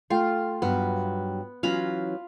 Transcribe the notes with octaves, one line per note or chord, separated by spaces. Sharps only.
A3 F4 G5
G2 F#3 B3
E3 F#3 C#4 F4 A#5 B5